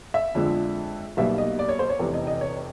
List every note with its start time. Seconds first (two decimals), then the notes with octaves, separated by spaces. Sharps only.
0.14 E5
0.35 F2 D3 F3 G#3
1.17 B1 B2 G3 A#3 E5
1.38 D#5
1.59 D5
1.69 C#5
1.79 C5
1.90 C#5
1.99 F1 E2 C3
2.14 D#5
2.27 D#5
2.41 C#5